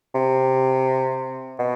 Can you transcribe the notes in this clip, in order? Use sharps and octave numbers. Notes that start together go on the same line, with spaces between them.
C3
B2